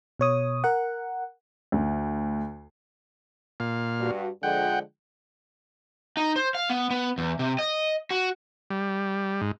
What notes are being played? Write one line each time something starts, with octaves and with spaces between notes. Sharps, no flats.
B2 C#5 D#6
A#4 F#5
D2
A#2 F5
G2 F#4
D3 F3 G#3 F#5 G5
D#4
C5
F5
B3
B3
E2
C3
D#5
F#4
G3
G#2